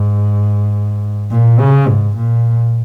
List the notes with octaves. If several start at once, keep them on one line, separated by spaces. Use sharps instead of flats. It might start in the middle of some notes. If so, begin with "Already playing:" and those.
Already playing: G#2
A#2
C#3
G#2
A#2